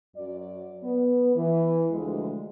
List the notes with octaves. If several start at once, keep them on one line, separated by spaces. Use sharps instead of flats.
F#2 F#3 D5
B3
E3
D2 F3 G#3